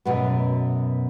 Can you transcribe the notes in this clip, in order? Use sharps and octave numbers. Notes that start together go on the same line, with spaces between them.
F#2 B2 A3 B3